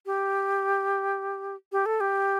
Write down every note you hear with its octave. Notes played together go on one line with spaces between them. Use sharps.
G4
G4
A4
G4